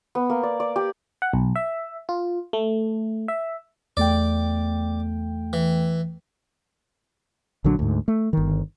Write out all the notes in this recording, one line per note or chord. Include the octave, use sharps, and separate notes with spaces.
B3
A#3
D5
D5
G4
F#5
B1
E5
F4
A3
E5
E2 A3 D5 G5
E3
A#1 D3 F#3 D4
D2 G#2
A3
G1 D#3